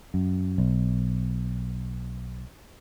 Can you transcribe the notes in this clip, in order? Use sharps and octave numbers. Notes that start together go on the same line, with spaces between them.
F#2
B1